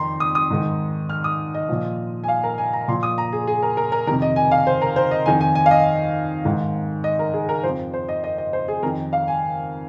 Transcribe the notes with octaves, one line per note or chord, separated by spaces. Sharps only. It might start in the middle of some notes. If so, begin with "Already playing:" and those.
Already playing: F2 D#3 A#5 C6
D#6
D#6
G#2 D#3
F6
D#6
D#5
A#2 F3
G#5
F5
A#4
G#5
A#5
A#2 F3 C6
D#6
A#5
G#4
G#4
A#4
A#4
A#4
F2 C3 D#3 A#4
D#5
G#5
F5
C5
A#4
C5
D#5
F2 D#3 G#5
G#5
G#5
F5
D#5
G#2 D#3
D#5
A#4
G#4
A#4
F2 F3 C5
C5
D#5
D#5
D#5
C5
G#4
F2 D#3 A#4
F5
G#5